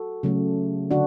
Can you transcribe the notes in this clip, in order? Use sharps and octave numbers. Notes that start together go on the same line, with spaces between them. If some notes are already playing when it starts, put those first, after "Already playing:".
Already playing: F#4 A4
C#3 F#3 A3
D3 D4 F#4